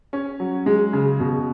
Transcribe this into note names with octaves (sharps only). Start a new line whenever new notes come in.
C#4
F#3
G#3
C#3
B2